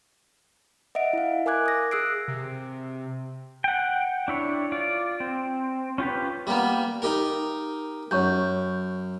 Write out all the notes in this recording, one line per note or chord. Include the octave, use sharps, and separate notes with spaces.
D#5 E5 F#5 D7
E4 F5
A#4 G#5 D6 F#6 G#6
D#6 A#6
G#4 D#6 E6 F#6 C7 D7
C3
F#5 G5
D4 E4 C#5
F4 D5
C4
C#4 F4 G4 B4
G3 A#3 B3
D#4 G4 A#4
F#2 C#5 C#6 G6